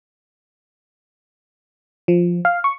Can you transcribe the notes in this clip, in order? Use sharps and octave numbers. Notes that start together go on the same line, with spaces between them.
F3
F5
C#6